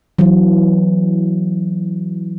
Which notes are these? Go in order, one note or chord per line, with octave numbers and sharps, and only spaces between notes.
E3 F#3